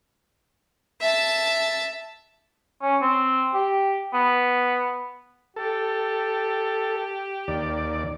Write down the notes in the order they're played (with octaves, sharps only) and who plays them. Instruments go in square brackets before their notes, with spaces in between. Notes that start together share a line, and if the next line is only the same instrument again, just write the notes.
[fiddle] E5 A5
[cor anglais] C#4
C4
G4
B3
[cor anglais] G4 [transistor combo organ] A4
[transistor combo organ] D#2 D5